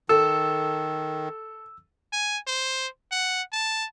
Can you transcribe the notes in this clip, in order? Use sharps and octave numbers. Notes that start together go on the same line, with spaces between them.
D#3 A4 E6
G#5
C5
F#5
A5